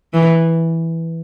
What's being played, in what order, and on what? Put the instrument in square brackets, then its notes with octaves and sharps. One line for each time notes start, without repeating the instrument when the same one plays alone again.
[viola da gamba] E3